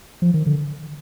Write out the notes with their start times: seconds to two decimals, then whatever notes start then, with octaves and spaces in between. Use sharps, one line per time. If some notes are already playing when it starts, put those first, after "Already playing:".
0.22 F3
0.34 D#3
0.46 D3